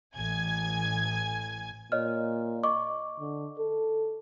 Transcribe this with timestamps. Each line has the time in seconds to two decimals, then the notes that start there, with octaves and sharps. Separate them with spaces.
0.15 A1 G#5 G#6
1.92 A#2 C#5 D#5 F6
2.63 D#5 C#6 D6
3.20 D3
3.58 A4